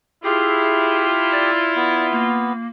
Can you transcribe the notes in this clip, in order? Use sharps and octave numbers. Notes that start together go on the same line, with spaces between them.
E4 F4 G4 G#4
D5
B3
A#3